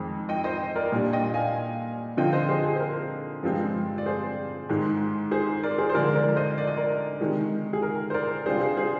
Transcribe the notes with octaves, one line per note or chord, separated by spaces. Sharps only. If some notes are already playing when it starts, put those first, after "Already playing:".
Already playing: F2 D#3 G#3 C4
D#5 G5
C5 D#5
A#4 D5
A#2 G3 D4
D#5 G5
F5 G#5
D3 F3 C4 F4 D#5 G5
C5 D#5
G#4 C5
G#4
C5
A#4
G2 F3 G#3 C4
D5
G#4 C5
G#2 D#3 G#3
G#4 C5
A#4 D5
G#4 C5
C5
D3 F3 G#3 D4 A#4 D5
A#4 D5
C5 D#5
D5
D#5
A#4 D5
C3 D#3 G#3
G#4
A#4
C5
A#4 D5
C3 G3 D4 F4 G#4 C5
G#4 C5
G#4 C5